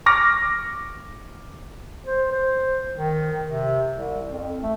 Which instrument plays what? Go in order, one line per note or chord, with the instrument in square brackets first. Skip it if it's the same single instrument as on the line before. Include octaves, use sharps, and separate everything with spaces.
[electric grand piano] C#6 D6 F6 A#6
[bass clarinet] C5
C5
D#3
C3
C2
F2
A3